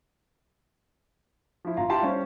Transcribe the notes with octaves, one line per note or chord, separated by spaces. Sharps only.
F3 E4
G1 F4 F5 A#5
E4 G4 F5 A5 C6
G3 C#4 C5